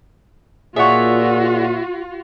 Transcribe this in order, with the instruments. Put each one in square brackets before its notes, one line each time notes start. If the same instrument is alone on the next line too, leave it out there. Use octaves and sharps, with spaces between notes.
[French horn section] A#2 [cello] F4 F#4 [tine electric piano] G#4 D5 F#5 [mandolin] C#5 E5